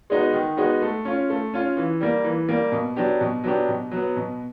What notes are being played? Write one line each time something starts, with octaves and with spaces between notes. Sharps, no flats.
G#3 B3 D#4 F#4
D#3
G#3 B3 D#4 F#4
A3
C#4 F4
A3
C#4 F4
E3
G3 A#3
E3
G3 A#3
B2
F#3 B3 D4 G4
B2
F#3 B3 D4 G4
B2
F#3 B3
B2